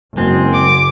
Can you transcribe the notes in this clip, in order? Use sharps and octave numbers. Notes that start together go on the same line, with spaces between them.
F#1 G#3 C4
D6